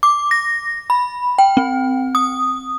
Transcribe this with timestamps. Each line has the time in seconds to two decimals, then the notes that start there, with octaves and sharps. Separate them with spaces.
0.03 D6
0.31 A#6
0.90 B5
1.38 G5
1.57 C4
2.15 D#6